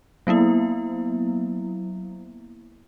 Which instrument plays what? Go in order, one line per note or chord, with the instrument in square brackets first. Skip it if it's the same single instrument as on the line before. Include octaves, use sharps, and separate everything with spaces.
[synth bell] F#3 A#3 B3 E4